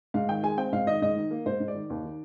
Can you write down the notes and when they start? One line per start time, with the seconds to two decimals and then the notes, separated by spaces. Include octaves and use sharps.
0.14 G#2 F5
0.29 D#3 G5
0.43 G#3 G#5
0.58 C4 G5
0.72 G#2 F5
0.87 D#3 D#5
1.02 G#2 D#5
1.16 D#3
1.31 A#3
1.46 G#2 C5
1.60 G#2
1.68 D5
1.75 D#3
1.90 D#2
2.04 D#3